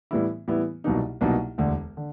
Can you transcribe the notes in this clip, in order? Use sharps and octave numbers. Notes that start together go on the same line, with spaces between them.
A2 E3 G3 B3 E4
A2 E3 G3 B3 E4
C2 B2 F#3 A#3 D#4
C2 B2 F#3 A#3 D#4
E1 D2 D3
D3